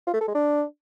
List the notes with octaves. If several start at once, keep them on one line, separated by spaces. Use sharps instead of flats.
F4
A3
A4
G#3
D4